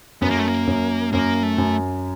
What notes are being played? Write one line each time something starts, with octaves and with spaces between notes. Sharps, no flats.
F#2 B3
A#3
A3
A#3
F#2
F#2 A#3
A3
F#2